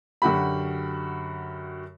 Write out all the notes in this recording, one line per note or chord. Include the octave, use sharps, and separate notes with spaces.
F#2 D3 F#4 G4 B5